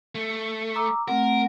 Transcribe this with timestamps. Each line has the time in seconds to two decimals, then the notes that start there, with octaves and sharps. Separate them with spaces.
0.15 A3
0.75 A#5 D6 E6
1.08 A3 C4 A#4 F#5